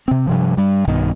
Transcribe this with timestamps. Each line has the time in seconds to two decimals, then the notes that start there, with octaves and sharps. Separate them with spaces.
0.08 C3 C4
0.27 G2 C3 F3
0.57 G2 G3
0.87 B1 G2 B2 D#3